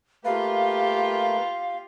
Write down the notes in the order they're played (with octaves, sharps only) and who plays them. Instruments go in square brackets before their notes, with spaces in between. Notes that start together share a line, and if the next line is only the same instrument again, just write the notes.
[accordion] A3 A#3 B4 [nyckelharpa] F4 G4 [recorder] F5